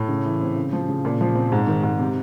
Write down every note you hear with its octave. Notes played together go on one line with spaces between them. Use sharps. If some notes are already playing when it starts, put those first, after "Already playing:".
Already playing: A2
C#3
E3
C4
C#3
F3
C#3
A#2
F3
C4
G#2
D#3
G#2
C3